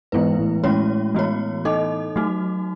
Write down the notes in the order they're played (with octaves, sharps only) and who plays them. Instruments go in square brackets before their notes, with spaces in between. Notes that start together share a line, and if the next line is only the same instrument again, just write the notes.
[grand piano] G#2 [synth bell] E3 G#3 B3 E4 B4
[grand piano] A2
[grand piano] A2 [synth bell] G#3 C#4 F#4 C#5
[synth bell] E3 B3 F#4 C#5
D#4 A4 D#5
F#3 A3 D#4 F#4